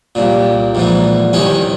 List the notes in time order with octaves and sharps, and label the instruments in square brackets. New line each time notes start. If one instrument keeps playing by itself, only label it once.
[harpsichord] C2 A#2
A#1 G#2 E3
C2 C3 D#3 C#4